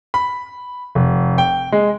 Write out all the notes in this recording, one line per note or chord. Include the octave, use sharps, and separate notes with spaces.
B5
F1
G5
G#3